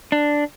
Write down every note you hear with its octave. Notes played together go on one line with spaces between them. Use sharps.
D4